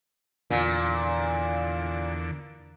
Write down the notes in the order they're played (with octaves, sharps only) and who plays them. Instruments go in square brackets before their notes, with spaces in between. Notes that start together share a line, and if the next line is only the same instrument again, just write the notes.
[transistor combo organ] E2 D3 [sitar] A#2